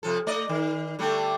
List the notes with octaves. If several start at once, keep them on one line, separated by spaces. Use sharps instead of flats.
C3 F3 A4
A3 D5 D#5
D#3
D3 G3 A3